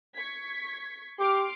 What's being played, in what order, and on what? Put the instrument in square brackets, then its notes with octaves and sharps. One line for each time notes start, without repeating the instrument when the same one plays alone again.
[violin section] C#6 G#6 B6
[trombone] G4 [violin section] C6 D6 F6